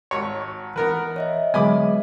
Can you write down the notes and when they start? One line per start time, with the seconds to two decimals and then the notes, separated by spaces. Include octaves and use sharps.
0.11 G#1 C#5
0.76 E3 B3 A#4 B4
1.16 C#5 D#5 E5
1.54 D3 F#3 G#3 B3 G#5 B5 D6